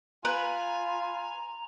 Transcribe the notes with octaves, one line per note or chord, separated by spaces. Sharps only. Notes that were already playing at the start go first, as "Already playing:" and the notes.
F4 B4 G#5 A#5